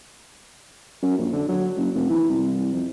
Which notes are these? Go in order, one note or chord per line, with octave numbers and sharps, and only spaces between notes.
F#2
A#1
D3
F#3
F#1
F1
E3
C2
F2